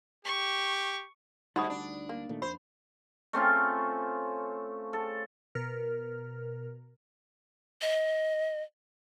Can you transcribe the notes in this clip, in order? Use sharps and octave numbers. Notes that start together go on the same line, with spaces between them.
G4 C#6
D2 G#2 G3 D#4 F#4 B5 D#6
D4
A#3
A#2 D#3 A3
F2 C5 B5
A3 C4 C#4 F4
A4
B2 A#4 F6
D#5